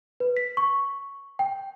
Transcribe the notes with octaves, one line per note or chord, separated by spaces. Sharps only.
B4
B6
C#6
G5